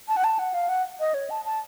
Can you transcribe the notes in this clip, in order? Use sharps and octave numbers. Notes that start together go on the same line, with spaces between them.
A5
F#5
A5
F#5
F5
F#5
D#5
C#5
A5
A5